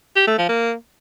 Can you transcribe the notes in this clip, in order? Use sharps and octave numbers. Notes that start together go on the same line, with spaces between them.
G4
A3
F3
A#3